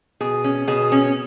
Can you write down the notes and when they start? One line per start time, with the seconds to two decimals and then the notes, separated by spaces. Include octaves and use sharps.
0.21 B2 G#4
0.44 C#4
0.68 B2 G#4
0.92 C#4